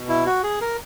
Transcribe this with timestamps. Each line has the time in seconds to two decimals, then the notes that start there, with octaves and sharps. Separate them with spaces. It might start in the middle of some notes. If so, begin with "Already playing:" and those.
Already playing: B2
0.09 E4
0.26 F#4
0.44 G#4
0.61 A#4